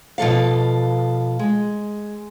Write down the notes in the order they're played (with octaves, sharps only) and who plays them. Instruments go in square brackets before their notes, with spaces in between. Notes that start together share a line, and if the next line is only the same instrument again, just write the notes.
[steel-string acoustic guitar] B2 F3 A4 F5
G#3